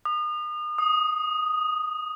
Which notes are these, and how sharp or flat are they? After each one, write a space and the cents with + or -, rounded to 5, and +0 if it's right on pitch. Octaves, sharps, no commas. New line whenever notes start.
D#6 -35
D#6 +0